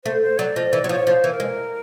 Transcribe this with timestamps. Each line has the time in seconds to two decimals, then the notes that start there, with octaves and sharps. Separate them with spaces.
0.04 A3 C5
0.22 C5
0.38 F#3 D5
0.56 F3 D#5
0.72 E3 D5
0.84 F#3
0.89 F3 C#5
1.07 F3 C#5
1.10 C5
1.24 E3
1.31 A#4
1.40 G#3